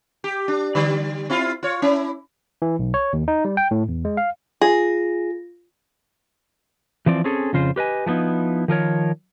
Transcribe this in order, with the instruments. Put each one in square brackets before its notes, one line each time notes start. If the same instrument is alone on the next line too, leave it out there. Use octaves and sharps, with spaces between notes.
[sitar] G4
D4
D3 G3
C4 E4 F4
F4 C#5
C#4 E4
[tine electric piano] E3
B1
C#5
D#2
D#4
G3
G5
A2
E2
G#3
F5
[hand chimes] F4 A#6 [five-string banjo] G#4
[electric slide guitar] E3 F3 C4 D5
C4 C#4 G#4 A4
F2 C#3 F4 C5
G4 B4 D#5 G#5
F3 A3 B3 D#4 E4
D#3 F3 A#4 C#5